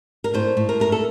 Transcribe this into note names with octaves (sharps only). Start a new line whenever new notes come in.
A#4
A2 C5
A2
A#4
A3 A#4
A4